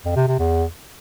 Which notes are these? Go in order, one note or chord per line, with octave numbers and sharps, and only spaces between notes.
F2
C3
C3
E2